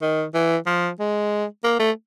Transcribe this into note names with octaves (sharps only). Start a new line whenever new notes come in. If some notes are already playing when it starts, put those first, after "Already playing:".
D#3
E3
F3
G#3
A#3
A3